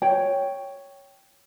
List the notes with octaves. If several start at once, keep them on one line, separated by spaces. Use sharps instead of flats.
C#5 G5